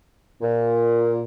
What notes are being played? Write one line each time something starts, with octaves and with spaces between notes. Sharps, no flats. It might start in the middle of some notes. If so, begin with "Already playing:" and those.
A#2